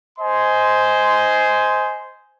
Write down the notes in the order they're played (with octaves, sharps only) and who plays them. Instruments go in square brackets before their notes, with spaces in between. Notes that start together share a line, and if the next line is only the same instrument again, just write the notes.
[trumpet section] C5 D#5 G#5 C6